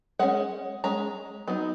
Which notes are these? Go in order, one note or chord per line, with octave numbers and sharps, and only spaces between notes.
G#3 C#4 F#5
G#3 C#4 A#5
F#3 B3 D#4